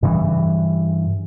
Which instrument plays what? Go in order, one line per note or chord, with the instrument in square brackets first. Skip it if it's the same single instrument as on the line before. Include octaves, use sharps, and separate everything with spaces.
[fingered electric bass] G2 C#3 E3 G3